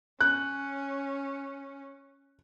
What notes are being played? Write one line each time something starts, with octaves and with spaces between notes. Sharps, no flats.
C#4 F#6